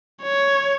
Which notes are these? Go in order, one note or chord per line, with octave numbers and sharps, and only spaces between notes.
C#5